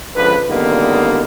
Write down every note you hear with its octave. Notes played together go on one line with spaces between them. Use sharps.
C#2 D3 F3 B4
C#2 D3 D#3 G3 A#3 B3